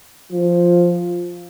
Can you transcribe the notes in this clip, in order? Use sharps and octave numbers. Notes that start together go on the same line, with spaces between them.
F3